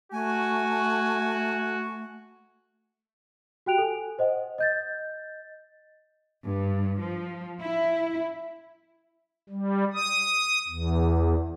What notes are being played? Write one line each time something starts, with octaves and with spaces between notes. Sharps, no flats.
A3 F#4 G#5
F#4 G4 G5 F#6 D7 F7
A4 G#5
C5 D#5 F#5
D#5 G6 A6
G2
F3
E4
G3
D#6
E2